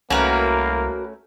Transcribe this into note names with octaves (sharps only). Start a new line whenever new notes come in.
C2 A3 A#3 C#4 F#4 A#4 B4